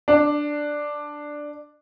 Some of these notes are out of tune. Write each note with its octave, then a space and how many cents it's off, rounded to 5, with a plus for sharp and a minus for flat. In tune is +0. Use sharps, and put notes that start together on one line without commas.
D4 +5